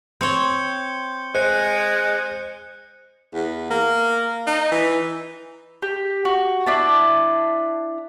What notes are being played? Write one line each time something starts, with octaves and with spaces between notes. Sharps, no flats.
C4 C#5 G6 C#7 G7
G#3 C5 F#6 C#7
E2
A#3
D#4
E3
G4
F#4
D4 E4 A5